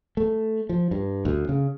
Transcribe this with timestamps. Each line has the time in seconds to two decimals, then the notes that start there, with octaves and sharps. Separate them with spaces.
0.17 A3
0.69 F3
0.91 G2
1.25 D2
1.49 C#3